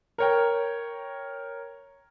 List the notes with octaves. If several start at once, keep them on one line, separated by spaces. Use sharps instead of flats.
A#4 C#5 G5